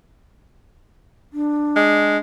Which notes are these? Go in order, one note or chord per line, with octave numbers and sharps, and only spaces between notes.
D4
G#3